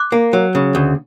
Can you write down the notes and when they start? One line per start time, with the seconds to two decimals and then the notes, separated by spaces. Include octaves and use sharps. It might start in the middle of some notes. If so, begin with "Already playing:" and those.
Already playing: D6 F#6
0.12 A#3
0.33 F#3
0.55 C#3
0.75 D2